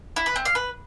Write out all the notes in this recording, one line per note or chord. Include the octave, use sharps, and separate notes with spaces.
E4
B4
C4
F5
B4